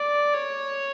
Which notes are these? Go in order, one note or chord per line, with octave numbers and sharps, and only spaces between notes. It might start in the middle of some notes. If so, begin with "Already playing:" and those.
Already playing: D5
C#5